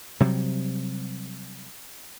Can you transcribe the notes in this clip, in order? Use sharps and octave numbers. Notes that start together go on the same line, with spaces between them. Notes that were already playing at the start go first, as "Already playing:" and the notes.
C3 F#3 G3